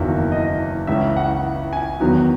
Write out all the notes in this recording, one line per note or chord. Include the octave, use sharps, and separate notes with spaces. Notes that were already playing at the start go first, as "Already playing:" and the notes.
Already playing: F#1 E2 D#3 F#3 A#3 E5
D#5
C#2 C#3 E3 E5
F#5
G#5
E2 D#3 F#3 B3